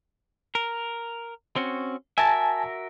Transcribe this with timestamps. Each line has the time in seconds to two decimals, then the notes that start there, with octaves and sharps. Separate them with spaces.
0.55 A#4
1.56 C4 C#4 F#4
2.18 F#4 A#4 E5 G#5 A5